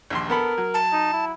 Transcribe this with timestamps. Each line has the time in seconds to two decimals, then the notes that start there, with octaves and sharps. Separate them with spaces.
0.10 A#1 D#2 C6
0.30 B3 A4 A#4 B5
0.58 F#3
0.74 A5
0.93 D#4
1.13 E4